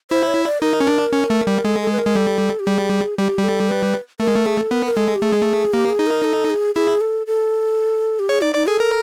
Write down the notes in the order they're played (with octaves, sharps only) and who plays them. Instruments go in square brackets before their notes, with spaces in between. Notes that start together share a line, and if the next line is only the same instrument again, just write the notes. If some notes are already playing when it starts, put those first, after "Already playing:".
[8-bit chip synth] E4 [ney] C5
[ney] C#5
D5
[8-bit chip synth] D#4 [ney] A#4
[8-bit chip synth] C#4
D4
C#4
A3
G3
[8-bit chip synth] G#3 [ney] A4
[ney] A4
B4
A#4
[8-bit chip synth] G#3
[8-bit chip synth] G3 [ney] A4
[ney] G4
[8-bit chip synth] G3 [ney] G#4
[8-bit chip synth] G3 [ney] G4
[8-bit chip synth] G3
[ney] A4
B4
[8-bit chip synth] A3 [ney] A#4
[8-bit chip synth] G#3
A3
[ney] G#4
A4
[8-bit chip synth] B3 [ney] A#4
[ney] A#4
[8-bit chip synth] G#3 [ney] A4
[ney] G4
[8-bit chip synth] A3 [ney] G#4
[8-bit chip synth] G#3
A3
[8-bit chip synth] A#3 [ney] G4
[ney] G#4
[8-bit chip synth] D#4
[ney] A#4
A4
G#4
[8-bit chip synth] E4 [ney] G#4
[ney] A4
A4
G4
[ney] G#4 [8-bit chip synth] C#5
[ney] D#4 [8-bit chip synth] D5
[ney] D#4 [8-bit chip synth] D5
[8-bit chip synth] G#4 [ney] A4
[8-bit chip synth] A#4